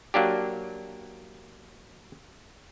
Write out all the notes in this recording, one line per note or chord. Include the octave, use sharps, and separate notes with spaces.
F#3 A#3 D4 G4